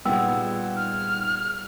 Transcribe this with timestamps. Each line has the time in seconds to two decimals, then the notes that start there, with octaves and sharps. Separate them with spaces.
0.05 A#2 G3 B3 D#4 G#4 F#5 G5 E6
0.76 F6